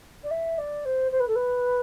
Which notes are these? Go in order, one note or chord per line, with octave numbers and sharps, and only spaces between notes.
D5
E5
D5
C5
C5
B4
A4
B4